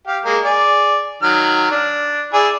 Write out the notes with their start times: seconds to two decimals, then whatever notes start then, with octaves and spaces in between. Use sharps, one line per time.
0.07 G4 F5
0.25 G#3 A#3
0.44 G#4 D5
1.23 D#3 F#3 F6
1.71 D4
2.33 E4 G#4 D5